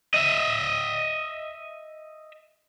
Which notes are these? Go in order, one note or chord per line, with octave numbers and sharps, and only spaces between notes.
D#5 E5